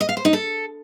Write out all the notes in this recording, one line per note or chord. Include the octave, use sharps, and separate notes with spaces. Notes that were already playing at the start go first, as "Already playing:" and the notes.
D#5
F5
C5
D#4
A4